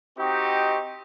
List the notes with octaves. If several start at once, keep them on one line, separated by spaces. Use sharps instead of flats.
C4 D#4 F#4 G4 D#5 C#6